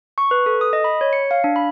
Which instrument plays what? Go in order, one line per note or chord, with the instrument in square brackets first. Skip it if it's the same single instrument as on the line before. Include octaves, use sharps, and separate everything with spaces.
[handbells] C#6
B4
A4
D#6
D#5
B5
C#5
C#7
F5
D4
B5